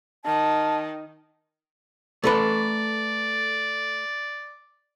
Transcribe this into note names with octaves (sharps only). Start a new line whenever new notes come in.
D#3 A5
A3 A4 B4 D5